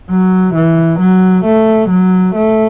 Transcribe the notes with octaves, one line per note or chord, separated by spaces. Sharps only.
F#3
E3
F#3
A3
F#3
A3